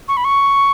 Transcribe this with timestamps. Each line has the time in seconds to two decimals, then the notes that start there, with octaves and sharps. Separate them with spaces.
0.08 C#6
0.17 B5
0.24 C#6